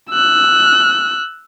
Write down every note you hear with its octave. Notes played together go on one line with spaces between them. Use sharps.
E6 F#6